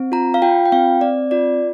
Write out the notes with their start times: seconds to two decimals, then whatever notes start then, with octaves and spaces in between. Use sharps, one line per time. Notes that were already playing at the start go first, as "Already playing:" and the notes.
Already playing: C4
0.12 F4 A#5
0.34 F5
0.42 F4 G5
0.65 G5
0.72 C4 F5
1.01 C4 D5
1.31 F4 D5